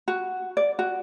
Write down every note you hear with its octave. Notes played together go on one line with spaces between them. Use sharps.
F#4
D5
F#4